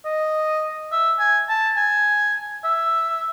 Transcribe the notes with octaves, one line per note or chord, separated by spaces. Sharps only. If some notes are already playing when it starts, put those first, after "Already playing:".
D#5
E5
G#5
A5
G#5
E5